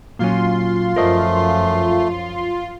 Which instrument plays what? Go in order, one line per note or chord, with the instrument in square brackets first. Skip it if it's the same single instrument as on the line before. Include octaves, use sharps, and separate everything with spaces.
[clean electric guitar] A#2 F#3 C#4 [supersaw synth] F4 C6
[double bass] F#2 F3 [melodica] A3 [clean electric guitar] A#4 C5 D#5